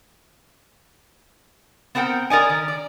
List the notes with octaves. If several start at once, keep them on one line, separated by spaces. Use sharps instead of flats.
B3 C4 A#4 F#5 G5
A#4 D5 D#5 G#5
D#3
D5